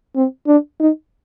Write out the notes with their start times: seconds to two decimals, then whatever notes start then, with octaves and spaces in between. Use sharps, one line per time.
0.16 C4
0.47 D4
0.80 D#4